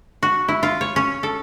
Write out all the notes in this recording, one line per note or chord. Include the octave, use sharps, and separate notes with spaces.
F#4
E4
F4
C#5
C#4
A4